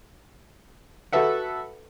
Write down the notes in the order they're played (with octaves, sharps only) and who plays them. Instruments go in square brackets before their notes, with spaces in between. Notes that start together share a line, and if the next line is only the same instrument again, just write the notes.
[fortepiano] F#4 A4 B4 E5 F#5